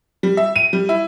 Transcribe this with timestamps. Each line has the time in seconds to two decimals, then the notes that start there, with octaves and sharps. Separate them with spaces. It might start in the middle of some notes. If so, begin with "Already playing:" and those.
0.23 G3
0.37 E5
0.56 D#7
0.73 G3
0.89 E4